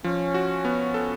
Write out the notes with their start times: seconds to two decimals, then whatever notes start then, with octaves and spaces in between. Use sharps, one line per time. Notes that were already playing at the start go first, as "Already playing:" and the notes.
0.04 F3 C#4
0.34 F#4
0.65 B3
0.94 A4